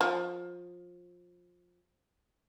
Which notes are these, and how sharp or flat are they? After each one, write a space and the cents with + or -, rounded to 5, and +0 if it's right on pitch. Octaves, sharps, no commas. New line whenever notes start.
F3 +20